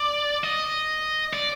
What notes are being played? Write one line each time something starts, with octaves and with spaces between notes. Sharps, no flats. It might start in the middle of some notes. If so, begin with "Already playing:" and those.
Already playing: D5
D#5
D5